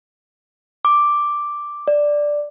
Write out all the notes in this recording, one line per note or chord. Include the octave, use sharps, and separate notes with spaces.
D6
D5